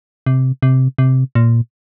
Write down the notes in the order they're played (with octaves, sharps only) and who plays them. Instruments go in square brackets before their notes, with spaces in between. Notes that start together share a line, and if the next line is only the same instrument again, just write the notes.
[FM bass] C3
C3
C3
A#2